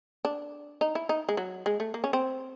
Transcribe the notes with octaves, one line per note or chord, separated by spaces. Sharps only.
D4
D#4
E4
D#4
G#3
F#3
G#3
A3
A#3
C#4
C4